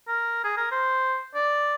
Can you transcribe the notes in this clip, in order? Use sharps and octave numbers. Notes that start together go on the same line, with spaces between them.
A#4
G#4
A#4
C5
D5